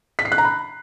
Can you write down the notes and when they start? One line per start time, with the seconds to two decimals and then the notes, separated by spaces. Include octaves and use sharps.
0.19 B6
0.25 C7
0.32 F#6
0.38 A#5
0.45 B5